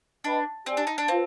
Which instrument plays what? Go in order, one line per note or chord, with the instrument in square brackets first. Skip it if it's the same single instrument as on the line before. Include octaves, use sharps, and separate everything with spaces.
[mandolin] D4 [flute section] B4 D#5 G5 B5
[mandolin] C4 [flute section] G4 D5 G#5
[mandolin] D4
D#4
D4
[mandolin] C4 [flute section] F4 B4 F5